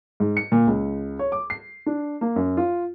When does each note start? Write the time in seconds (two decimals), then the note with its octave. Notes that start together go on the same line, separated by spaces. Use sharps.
0.20 G#2
0.37 C#7
0.52 A#2
0.67 C#2
1.19 C#5
1.32 D6
1.50 C7
1.86 D4
2.21 A#3
2.36 F#2
2.57 F4